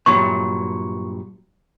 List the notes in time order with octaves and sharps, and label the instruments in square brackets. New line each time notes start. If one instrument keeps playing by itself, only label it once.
[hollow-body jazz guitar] G2 A#2 F#3 [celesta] C#6